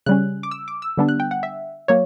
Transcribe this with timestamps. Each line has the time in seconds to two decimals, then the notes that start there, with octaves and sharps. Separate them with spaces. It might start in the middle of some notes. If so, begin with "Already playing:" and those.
0.06 C#3 G3 C#4 F#6
0.43 D6
0.51 E6
0.68 D6
0.82 E6
0.97 D3 G3 B3 D4
1.09 F#6
1.20 G5
1.31 F#5
1.43 E5
1.88 F#3 A#3 C#5